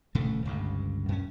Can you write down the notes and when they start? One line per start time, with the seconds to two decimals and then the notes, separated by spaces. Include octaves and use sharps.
0.15 D#1 A2 C#3 A3
0.45 G1 C#2 G2
1.08 F#2 C#4